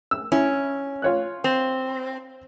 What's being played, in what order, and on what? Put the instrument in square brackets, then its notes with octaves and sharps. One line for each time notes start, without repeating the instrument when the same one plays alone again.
[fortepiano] E6
[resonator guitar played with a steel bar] C#4 [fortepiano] E4
[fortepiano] F4 C#5 F#6
[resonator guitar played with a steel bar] C4